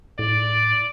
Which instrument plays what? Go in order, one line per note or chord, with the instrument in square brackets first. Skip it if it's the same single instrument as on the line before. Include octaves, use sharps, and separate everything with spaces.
[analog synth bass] A2 [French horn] D5